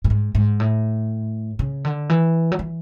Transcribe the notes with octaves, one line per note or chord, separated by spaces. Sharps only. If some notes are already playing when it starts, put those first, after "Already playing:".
A2
G#2
G#2
A2
C#3
D3
E3
F#3
E3